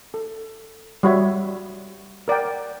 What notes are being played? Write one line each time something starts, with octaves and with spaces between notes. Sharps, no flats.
A4
G3 F#4 C#5 E5
A#4 D5 F#5 G5